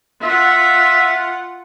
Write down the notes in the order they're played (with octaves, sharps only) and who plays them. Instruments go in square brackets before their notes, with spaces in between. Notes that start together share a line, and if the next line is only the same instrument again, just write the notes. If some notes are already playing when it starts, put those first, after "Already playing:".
[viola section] F4 F#5 [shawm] E5